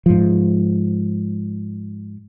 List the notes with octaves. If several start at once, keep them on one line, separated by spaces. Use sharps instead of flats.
G#2 F3